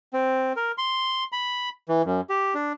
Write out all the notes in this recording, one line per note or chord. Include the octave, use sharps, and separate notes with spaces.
C4
A#4
C6
B5
E3
F#2
G4
D4